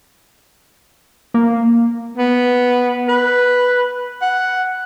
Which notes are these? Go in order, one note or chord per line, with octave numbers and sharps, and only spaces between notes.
A#3
B3
B4
F#5